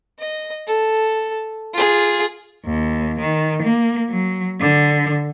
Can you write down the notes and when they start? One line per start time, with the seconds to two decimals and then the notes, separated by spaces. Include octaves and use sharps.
0.19 D#5
0.67 A4
1.74 F4 G#4
2.64 D#2
3.20 D#3
3.63 A#3
4.11 F#3
4.60 D3